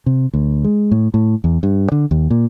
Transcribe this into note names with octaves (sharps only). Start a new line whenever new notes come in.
C3
D2
G#3
A2
A2
E2
G2
D3
D#2
A#2